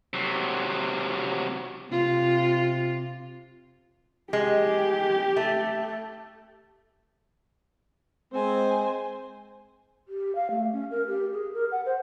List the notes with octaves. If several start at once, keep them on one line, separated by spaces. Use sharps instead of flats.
C3 F#3
C3 F4
G#3 G4
A3
G#3 C4 C5 G#5
G4
F5
A3
C#4
A#4
G4
G#4
A#4
F#5
C5